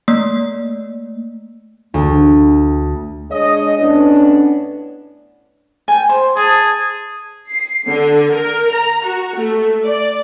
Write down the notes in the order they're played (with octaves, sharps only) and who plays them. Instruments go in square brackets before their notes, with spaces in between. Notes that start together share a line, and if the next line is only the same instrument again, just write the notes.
[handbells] A3 A#3 E6
[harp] D2
[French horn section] G#3 D4 C#5 D#5
A2 B3 C#4 D4
[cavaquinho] G5 G#5
C5
[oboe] G#4 [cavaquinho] A5
[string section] C7
D3
A#4
A#5
F#4
A3
D5